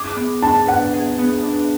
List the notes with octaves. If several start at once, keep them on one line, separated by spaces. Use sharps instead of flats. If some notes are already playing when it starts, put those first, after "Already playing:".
Already playing: G#4 D6
B3
D4 A5
B4 F#5
G#4
B3
D4